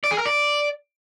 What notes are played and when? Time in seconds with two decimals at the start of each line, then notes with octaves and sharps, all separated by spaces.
0.04 D5
0.11 G#4
0.18 A#4
0.25 D5